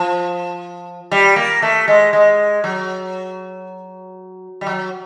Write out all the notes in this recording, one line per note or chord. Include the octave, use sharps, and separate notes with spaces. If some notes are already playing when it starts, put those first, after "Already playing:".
Already playing: F3
G3
A#3
A3
G#3
G#3
F#3
G3
F#3